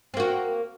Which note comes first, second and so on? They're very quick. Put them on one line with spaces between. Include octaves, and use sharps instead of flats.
C4 A#3 F#4